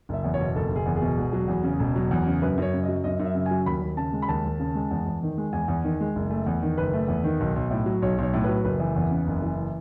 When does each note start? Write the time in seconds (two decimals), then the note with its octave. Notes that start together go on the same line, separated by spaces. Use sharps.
0.09 F#1 E5
0.24 E2
0.34 C#5
0.39 B2
0.55 F#1 A4
0.71 F#1
0.76 G#4
0.86 E2
0.96 G#4
1.02 B2
1.18 E1
1.33 F#3
1.48 E2
1.64 C#3
1.80 E1
1.96 F#3
2.11 E2
2.27 C#3
2.42 F#2 B4
2.58 F#2 C#5
2.74 C#3
2.83 D#5
2.89 F#3
3.04 F#2 D#5
3.19 F#2
3.25 E5
3.35 C#3
3.46 G#5
3.51 F#3
3.66 D#2 B5
3.82 D#2
3.97 C#3 A5
4.13 G#3
4.22 B5
4.28 D#2 A5
4.44 D#2
4.60 C#3
4.75 G#3
4.91 E2
5.06 E2
5.23 D#3
5.38 G#3
5.53 E2 G#5
5.68 E2
5.84 D#3
6.00 G#3
6.15 F#1
6.30 A3
6.46 E2
6.62 D#3
6.78 F#1 B4
6.93 A3
7.08 E2
7.24 D#3
7.40 B1
7.56 B1
7.70 A2
7.86 F#3
8.02 B1 C#5
8.18 B1 C#5
8.34 A2
8.44 F#3 B4
8.64 F#1 B4
8.79 E3
8.96 E2
9.11 C#3
9.27 F#1
9.42 E3